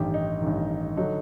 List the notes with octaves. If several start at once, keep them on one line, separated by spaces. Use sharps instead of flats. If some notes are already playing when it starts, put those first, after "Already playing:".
Already playing: A1 G2 D#3 G4
D#4
A1 G2 D#3
D3 F#3 D#4